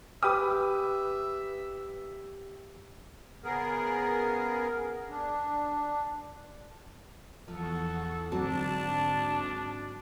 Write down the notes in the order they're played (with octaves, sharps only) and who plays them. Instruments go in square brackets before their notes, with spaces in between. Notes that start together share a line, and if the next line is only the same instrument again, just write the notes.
[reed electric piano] G4 G5 D6 [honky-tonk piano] B4 D#6 [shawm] E5
[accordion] C#3 B3 G#4 A#4
D4
[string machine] E2 F#5 C#6 [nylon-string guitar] F3 [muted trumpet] A4
[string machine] G#2 D3 [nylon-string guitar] F#3 C4 F#4 [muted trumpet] D4 [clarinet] A5